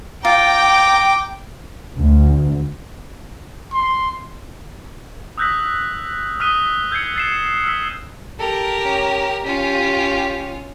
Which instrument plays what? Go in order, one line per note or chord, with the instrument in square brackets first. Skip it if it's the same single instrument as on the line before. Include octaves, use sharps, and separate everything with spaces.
[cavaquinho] F4 [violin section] G5 [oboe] A#5 [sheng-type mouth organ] D6
[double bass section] D2
[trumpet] C6
[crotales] D#6 E6 F#6 G6 A#6 B6
D#6 F6 F#6 B6 D#7
E6 G6 G#6 C7 C#7
A6 C7 E7
E6 F6 B6
[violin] G4 A#4 [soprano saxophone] A4
[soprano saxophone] C#4
[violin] C#4 F4 [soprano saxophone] G4